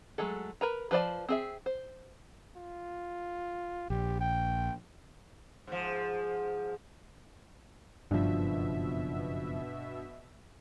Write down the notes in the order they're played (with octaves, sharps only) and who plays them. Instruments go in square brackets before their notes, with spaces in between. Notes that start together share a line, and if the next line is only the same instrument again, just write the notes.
[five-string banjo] F#3 G#3 A3 A4
A#4 B4 A#5
F3 B4 C5 D5 A5
C4 G#4 E5
C5
[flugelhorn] F4
[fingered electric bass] A#1 [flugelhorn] G4
[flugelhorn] G5
[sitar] G#2 F3
[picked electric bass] F#1 F3 [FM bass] G2 [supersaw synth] B2 E5 [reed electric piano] D4